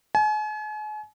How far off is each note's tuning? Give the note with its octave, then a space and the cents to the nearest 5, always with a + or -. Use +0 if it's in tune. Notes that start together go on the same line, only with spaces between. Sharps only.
G#5 +40